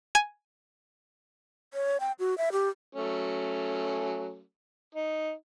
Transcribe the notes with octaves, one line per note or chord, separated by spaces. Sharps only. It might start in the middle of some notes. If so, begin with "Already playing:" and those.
G#5
C#5
G5
F#4
E5
G4
F#3 A3 C#4
D#4